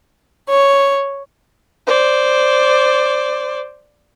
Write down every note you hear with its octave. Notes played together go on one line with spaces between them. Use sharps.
C#5
C5 D5